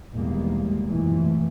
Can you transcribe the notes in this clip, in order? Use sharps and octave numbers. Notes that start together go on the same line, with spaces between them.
B1 E2 D#3 G3 G#3 A#3
F1 F#2 A#2 E3 F3 A3